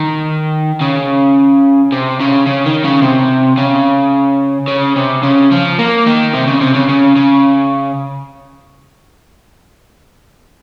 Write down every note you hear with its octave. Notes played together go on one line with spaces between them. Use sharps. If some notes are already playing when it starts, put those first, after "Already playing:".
Already playing: D#3
C#3
C3
C#3
C#3
D#3
C#3
C3
C#3
C#3
C3
C#3
F3
A#3
D#3
C3
C#3
C3
C#3
C#3
C#3